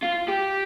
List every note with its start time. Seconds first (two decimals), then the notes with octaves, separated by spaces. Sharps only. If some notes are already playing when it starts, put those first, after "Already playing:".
0.03 F4
0.29 G4